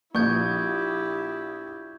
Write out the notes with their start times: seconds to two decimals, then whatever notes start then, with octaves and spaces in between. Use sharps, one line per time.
0.15 A#1 E4 G4 C#6 G6 G#6